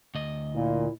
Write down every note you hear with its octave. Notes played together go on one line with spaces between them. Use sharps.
D2 D#5
A#2 E4